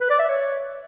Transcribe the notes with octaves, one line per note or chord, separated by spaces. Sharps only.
B4
D5
E5
C#5